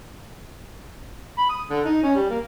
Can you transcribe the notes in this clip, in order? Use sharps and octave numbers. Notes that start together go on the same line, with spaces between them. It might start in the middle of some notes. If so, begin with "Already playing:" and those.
B5
D#6
D3
D#4
C#4
G3
A#3